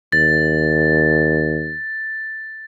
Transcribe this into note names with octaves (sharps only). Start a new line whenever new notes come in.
D#2 A6